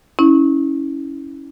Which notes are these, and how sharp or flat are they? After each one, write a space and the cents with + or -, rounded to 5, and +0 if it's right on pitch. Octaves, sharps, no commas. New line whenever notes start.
C#4 +0 E4 -25